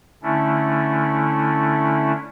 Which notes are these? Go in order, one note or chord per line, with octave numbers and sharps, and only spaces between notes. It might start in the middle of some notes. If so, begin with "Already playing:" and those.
D3 A3 C#4 D4 E4